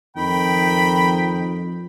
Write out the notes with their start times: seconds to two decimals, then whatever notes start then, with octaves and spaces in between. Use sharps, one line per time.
0.17 F2 D#3 G5 B5